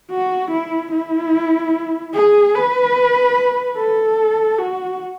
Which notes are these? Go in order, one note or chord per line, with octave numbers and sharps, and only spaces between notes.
F#4
E4
E4
G#4
B4
A4
F#4